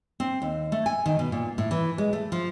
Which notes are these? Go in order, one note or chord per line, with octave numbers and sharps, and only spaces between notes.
C4
D#2
A3
G#5
D#3
B2
A#2
A2
E3
G#3
A3
F3